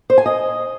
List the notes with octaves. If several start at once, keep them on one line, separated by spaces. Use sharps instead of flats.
C5
G#5
D#5